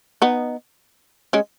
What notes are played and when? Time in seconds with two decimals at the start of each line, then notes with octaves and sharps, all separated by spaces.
0.22 B3 D#4
1.33 G#3 C#4